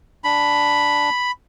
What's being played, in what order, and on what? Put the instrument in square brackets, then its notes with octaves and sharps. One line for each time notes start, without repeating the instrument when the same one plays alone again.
[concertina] D4 [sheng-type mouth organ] B5